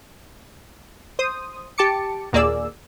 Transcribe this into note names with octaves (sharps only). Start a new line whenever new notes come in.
C5 D#6
G4 A5 D6 C#7
A#1 D#2 A#3 G#4 D5 E6